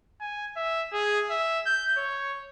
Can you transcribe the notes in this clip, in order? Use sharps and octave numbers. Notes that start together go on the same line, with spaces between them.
G#5
E5
G#4
E5
G6
C#5